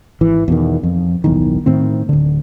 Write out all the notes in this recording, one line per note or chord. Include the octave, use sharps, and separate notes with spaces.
G#1 E3
E2 B2 D#3
F2
D1 B1 E2 D#3
A2 D#3 C4
D1 D3